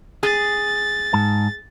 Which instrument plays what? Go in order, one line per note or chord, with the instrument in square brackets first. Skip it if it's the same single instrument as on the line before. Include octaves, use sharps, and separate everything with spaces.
[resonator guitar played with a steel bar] G#4 [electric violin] A6
[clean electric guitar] G#2 A5